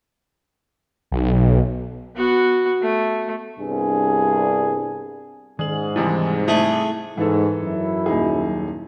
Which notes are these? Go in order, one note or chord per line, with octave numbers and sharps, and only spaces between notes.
B1
B3 F#4
A3
C2 G2 B3 D4 G#4
G#2 D#3 G#4 F#7
C3 E3 G3 G#3 E4
A3 E4 G#4
G#2 E3 A4
F#2 E4
D#1 D#4 G#4